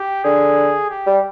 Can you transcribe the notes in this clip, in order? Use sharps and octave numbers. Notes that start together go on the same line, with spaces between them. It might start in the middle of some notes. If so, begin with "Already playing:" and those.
Already playing: G4
D3 G#4
G4
G3